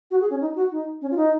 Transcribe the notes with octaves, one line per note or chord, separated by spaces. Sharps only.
F#4
G#4
C#4
D#4
F#4
D#4
C#4
F4
D#4